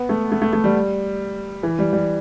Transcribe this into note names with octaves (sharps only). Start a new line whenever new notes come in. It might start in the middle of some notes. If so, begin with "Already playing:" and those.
Already playing: B3
A3
A3
A3
A3
G3
E3
G3
G3